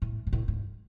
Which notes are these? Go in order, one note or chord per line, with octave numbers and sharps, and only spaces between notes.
A2
A#2
A2
G#2